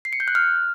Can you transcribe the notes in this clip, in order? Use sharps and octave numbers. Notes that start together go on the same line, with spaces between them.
C7
C#7
G6
F#6
F6